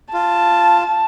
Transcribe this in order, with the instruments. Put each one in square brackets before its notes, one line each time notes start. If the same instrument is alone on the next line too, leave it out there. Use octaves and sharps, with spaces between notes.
[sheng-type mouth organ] F4 [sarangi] A5